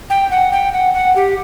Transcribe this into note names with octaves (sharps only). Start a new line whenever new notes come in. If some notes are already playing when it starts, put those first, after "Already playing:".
G5
F#5
G5
F#5
F#5
G4